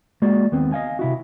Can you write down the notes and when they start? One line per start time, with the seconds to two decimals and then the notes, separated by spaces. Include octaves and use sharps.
0.22 G#3 A#3 F#4 D5
0.52 D#2 B3 C4
0.72 D#5 F5 G#5
0.99 C3 E4 F#4